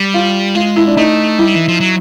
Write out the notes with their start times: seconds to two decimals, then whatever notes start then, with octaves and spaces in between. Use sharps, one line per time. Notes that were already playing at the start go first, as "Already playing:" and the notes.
Already playing: G3
0.14 F4
0.55 G#3 F4
0.76 E4
0.87 D4
0.97 A3 D#4
1.39 G3 E4
1.55 E3
1.68 F3
1.80 F#3